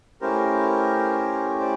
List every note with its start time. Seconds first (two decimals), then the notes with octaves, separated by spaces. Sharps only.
0.21 A3 C#4 E4 G4 A#4 C5
1.60 C5 D5